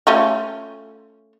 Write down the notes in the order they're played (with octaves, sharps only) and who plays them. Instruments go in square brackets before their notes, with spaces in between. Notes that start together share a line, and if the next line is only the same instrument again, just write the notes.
[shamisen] A3 C#4 F4